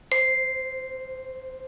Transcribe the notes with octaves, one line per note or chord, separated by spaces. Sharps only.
C5